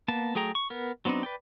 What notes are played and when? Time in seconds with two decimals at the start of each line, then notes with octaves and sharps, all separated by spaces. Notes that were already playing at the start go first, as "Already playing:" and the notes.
0.08 A#3 B3 A5
0.35 F#3 A3 G#4 G5 A#5
0.55 C#6
0.70 B3 A#4
1.05 F#3 B3 C4 D4 D#4
1.23 B4 D5 G5